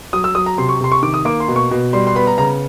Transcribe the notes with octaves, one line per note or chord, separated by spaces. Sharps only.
F#3 D#6
E6
F#3 D#6
A#5
C3 C6
C#6
C3 C6
C#6
D#3 D6
D#6
A#3 D6
C6
B2
C#6
B2
G3 C6
C6
B3 B5
A#5
C#3 A#5